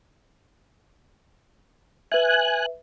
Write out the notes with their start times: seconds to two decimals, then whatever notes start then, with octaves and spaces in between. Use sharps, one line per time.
2.12 B4 E5 G#5 F#6